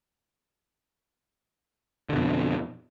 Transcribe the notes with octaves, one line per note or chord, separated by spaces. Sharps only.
F2 B2 D3